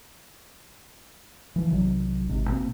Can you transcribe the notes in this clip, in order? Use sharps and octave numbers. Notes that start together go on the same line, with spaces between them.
E3 F3
B1 C3 D#3 F#3
G#1 G#2 C3
B2 A#3 C4